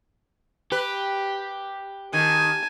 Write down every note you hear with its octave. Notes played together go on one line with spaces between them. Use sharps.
G4 B4
D#3 G#5 A5